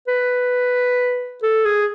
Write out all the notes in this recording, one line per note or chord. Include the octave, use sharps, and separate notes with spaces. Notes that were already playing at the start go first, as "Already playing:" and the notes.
B4
A4
G#4